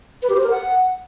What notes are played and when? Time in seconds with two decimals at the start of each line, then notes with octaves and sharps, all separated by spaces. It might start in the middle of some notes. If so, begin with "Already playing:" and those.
0.23 B4
0.30 G4
0.36 C5
0.43 A#4
0.50 F#5